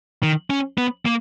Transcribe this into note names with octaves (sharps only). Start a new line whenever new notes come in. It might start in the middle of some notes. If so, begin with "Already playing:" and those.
D#3
C#4
B3
A#3